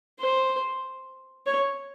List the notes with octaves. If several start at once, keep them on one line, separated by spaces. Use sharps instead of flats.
C5
C#5